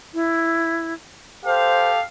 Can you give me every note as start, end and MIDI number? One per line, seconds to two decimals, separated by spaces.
0.14 0.93 64
1.46 2.01 67
1.46 2.01 69
1.46 1.90 72
1.46 2.01 77